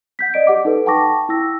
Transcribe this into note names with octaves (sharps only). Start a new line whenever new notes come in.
F#5 G6 B6
D5 D#5 D7
G4 F#5 D6
D#4 A4 B4
F#5 G5 A5 C#6 D6 A#6
E4 G5 E6 A#6